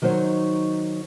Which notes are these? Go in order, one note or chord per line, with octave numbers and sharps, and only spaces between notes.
D#3 F#3 D#4 C5 C#5